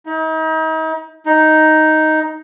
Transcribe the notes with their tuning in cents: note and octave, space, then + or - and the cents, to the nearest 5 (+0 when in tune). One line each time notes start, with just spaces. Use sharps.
D#4 +40
D#4 +5